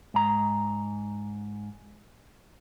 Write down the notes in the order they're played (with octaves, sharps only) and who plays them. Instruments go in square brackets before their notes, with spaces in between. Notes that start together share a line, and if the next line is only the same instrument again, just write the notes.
[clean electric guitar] G#2 A#5